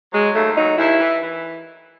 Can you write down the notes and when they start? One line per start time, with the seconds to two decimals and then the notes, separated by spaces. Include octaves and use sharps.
0.13 F#3 G#3
0.35 D#2 A3
0.57 F#3 D#4
0.78 D#2 E4
1.00 E3
1.22 E3